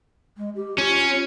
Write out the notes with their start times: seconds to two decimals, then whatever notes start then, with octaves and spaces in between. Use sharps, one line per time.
0.37 G#3
0.56 G4
0.78 C#4 F4